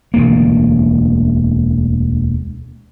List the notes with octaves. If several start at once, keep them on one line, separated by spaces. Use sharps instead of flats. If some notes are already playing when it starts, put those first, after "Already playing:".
E1 D2 A#3